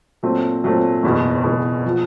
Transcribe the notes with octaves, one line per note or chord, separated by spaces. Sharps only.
A#2 F#3 A3 C4
A#2 F#3 A3 C4
F#1 E2 B2
F#1 E2 B2
F3